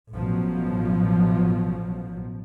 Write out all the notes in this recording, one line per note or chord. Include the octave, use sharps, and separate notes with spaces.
A1 B2 F3 F#3